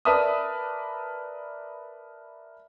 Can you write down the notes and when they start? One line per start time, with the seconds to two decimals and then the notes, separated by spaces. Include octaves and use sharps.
0.05 A#4 B4 D5 E5 A5 D#6